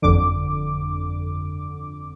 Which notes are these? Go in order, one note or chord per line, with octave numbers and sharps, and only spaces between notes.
G1 F2 D3 D6